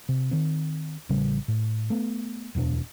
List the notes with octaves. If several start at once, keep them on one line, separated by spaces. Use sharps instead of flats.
C3
D#3 C4
A1 C#3 G3
A2
A3 B3
D1 E2 B2 D4